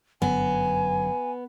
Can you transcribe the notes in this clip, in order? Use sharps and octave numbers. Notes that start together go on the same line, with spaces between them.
G1 F#2 D3 F#3 B3 G#5